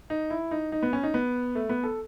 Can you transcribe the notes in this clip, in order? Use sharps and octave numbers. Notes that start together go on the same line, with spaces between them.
D#4
E4
D#4
D#4
B3
C#4
D#4
B3
A3
B3
A4